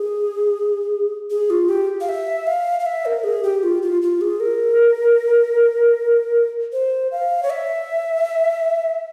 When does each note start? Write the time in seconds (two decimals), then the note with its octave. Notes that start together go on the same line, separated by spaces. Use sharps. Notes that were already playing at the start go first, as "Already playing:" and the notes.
Already playing: G#4
1.30 G#4
1.50 F4
1.69 G4
2.01 F5
2.09 E5
2.47 F5
2.80 F5
2.86 E5
3.06 A#4
3.24 G#4
3.43 G4
3.63 F4
3.82 F4
4.02 F4
4.21 G#4
4.40 A#4
6.73 C5
7.12 F5
7.43 C#5
7.51 E5